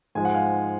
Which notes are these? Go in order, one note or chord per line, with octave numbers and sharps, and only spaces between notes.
G#2 F3 G#3 G#5
F#5
F5 G#5